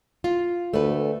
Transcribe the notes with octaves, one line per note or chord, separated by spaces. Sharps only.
F4
D2 A3 B4